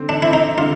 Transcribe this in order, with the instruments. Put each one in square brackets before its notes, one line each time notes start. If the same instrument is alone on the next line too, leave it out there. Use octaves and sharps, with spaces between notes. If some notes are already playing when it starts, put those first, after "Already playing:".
Already playing: [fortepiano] D3 C4
[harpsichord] D4
[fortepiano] C4 [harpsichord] E4
[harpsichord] D#4
[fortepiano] D3 [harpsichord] F4